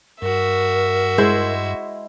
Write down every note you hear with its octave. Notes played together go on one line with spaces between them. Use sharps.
G2 F#4 A#4 E5
G#3 E4 C5